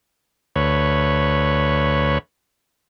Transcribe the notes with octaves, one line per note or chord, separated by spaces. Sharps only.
D2 B4 C#5